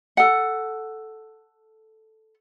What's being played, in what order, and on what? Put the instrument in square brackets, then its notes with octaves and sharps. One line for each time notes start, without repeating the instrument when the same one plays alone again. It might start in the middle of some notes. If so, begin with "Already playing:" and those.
[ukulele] A4 F#5